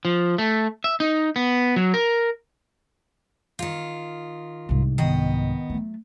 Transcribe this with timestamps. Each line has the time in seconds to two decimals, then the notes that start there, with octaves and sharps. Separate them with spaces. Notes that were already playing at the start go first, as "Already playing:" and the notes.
0.05 F3
0.38 A3
0.84 E5
1.00 D#4
1.36 B3
1.76 F#3
1.94 A#4
3.59 D#3 F4
4.69 C2 G#2
4.98 D#3 B3 D#5
5.70 F#3 A3